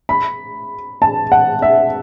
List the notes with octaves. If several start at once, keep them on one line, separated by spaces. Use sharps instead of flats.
B5
A5
F#5
E5